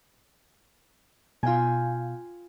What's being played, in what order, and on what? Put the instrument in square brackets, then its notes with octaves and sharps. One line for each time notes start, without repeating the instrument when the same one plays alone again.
[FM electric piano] B2 F5 [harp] F4 G5 G#5